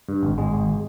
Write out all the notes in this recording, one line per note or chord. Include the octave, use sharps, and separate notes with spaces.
G2
G#1
G#1 G#3
G#1